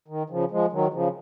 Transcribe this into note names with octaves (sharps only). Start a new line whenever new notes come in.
D#3
C#3 F3
F3 G#3
D#3 F#3
C#3 F3